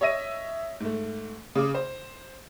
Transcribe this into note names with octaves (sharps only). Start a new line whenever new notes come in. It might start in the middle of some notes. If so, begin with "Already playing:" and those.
C#5 D#5 E5 A#6 D#7
G#2 A3
C#3 D6
C5